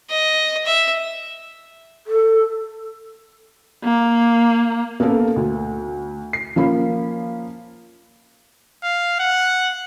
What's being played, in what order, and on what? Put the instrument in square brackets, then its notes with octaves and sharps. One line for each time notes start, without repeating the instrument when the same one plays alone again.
[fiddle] D#5
E5
[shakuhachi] A4
[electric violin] A#3
[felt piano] A#3 B3 C#4 A4 A#4
D2
C7
F3 A#3 C#4 B5
[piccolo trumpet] F5
F#5